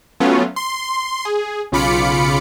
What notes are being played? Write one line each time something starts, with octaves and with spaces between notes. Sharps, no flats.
F#3 A3 B3 C#4 F4
C6
G#4
B1 C#3 F4 B5 D6 C#7